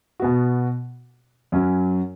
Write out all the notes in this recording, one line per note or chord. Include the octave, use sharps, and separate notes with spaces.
B2 B3 F#4
F#2 F#3 C#4 F#4